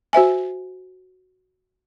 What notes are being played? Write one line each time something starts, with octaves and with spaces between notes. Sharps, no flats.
F#4 C5 E5 G#5